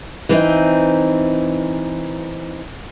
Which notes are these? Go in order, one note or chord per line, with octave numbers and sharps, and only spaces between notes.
E3 C4 D#4